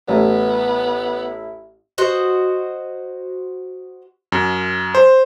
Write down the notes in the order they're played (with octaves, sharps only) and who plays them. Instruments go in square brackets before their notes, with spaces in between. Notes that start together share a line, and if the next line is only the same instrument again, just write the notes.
[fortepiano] A1 [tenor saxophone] B3 [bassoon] E4
[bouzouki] F#4 C5 D#5
[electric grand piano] F#2
C5